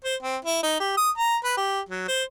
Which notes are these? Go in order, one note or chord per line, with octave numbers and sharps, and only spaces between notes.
C5
C4
E4
D#4
G4
D#6
A#5
B4
G4
F#3
C5